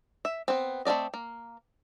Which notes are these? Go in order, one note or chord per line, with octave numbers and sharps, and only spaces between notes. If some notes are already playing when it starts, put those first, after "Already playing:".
E5
B3 C4
A3 C4 D4 D5 D#5
A#3